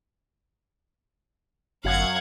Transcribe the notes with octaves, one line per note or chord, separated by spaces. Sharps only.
G1 F#2 F5 F#5 G#6